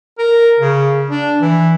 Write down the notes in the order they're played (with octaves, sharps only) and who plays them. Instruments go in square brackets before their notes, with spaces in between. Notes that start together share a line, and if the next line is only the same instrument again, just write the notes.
[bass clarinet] A#4
C#3
D4
E3